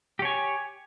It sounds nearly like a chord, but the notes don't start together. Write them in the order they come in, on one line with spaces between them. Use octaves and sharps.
G4 C#5 G#5